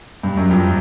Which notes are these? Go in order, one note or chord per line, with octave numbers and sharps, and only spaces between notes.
G2
F#2
F2